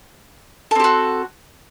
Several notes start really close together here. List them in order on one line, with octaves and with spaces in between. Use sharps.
A4 C4 G4 F#4